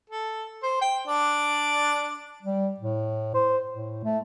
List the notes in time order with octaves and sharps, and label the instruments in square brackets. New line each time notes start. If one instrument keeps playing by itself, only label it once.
[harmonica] A4
C5
G5
D4 D5
[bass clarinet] G3
A2
C5
A2
A3